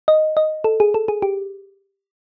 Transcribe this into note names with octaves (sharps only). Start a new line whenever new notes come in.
D#5
D#5
A4
G#4
A4
G#4
G4